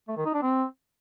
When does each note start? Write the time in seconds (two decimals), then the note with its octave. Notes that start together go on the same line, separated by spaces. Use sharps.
0.09 A3
0.17 D#3
0.25 D#4
0.34 D4
0.42 C4